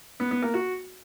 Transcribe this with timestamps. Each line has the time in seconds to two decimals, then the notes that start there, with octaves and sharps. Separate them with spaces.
0.20 B3
0.31 B3
0.42 A#3
0.54 F#4